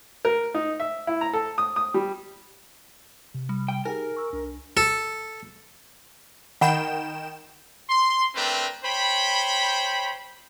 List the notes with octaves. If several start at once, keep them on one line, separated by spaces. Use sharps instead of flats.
A#4
D#4
E5
E4
A#5
A4
D#6
D#6
G3
C3
G3
G5
D#4 G4 G#4 A#4 G#5
C#6 E6
C2 D4
A4
D#3 F#5 G5 B5 E7
C6
A3 C4 D4 A#4 B4 G5
C5 C#5 G5 B5